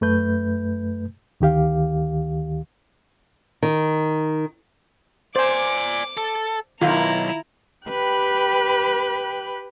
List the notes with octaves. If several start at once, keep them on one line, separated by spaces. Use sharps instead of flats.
F#2 A3 B4 G6
D2 D#3 G4 F5
D#3
C5 D5 G#5 D6
A4
B1 D#3 E4 F4 A#5
G4 B4 G5 B5 F#6